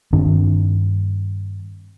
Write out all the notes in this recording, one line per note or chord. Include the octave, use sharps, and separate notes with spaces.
G2 D#3 C4 D4